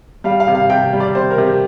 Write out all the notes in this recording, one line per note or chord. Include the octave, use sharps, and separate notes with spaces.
G3 F5
F5
C3
F5
C3 G5
G3
D5
C3 C5
A#4
C3
G4